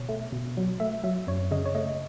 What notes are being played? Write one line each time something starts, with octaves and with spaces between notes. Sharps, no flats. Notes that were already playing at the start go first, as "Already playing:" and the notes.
Already playing: B2 C#5
A3
B2
F#3
A3 E5
F#3 E5
F#2 C#5
C#3 D#5
C#5
A3 D#5